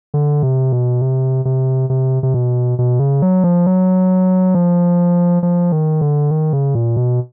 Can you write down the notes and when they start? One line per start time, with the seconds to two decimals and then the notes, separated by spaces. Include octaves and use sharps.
0.14 D3
0.43 C3
0.73 B2
1.02 C3
1.45 C3
1.90 C3
2.23 C3
2.34 B2
2.79 B2
3.00 C#3
3.22 F#3
3.44 F3
3.67 F#3
4.54 F3
5.43 F3
5.72 D#3
6.01 D3
6.30 D#3
6.53 C#3
6.75 A#2
6.97 B2